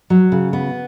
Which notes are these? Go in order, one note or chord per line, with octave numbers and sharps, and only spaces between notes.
F#3
C#3
B3